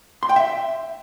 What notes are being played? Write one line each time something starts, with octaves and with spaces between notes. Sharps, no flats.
C6
G5
E5